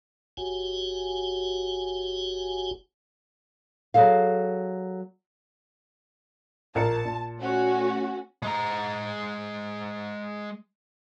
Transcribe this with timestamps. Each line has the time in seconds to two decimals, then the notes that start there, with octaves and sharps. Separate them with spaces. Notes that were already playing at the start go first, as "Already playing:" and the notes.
0.37 F#1 F#4 G4 G#5
3.94 F#3 G#4 A4 F5
6.75 A#1 A#4 A5 C#7
7.05 A#2
7.39 A3 C#4 F#4
8.42 G#3 A#5